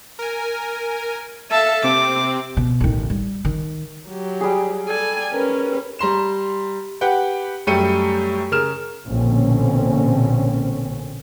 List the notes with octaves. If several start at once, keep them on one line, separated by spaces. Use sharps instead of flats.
A#4 G#5
A4 E5 F5 A5
C3 C4 D6
B2
A1 D#3
G3
D#3
F#3 G4
G3 G#4
A4 D5 G#5
C#4 A#4 B4
G3 A#5 C6 E7
G4 B4 F#5 G5
F#2 G3 A3 G5 C#7 D#7
C#3 A#4 F6 E7
A#1 B2 D3 A#3 C4 C#4